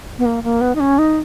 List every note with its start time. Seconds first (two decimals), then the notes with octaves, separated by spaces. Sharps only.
0.18 B3
0.25 A#3
0.43 A#3
0.61 B3
0.75 D#4
0.80 C#4
0.98 D#4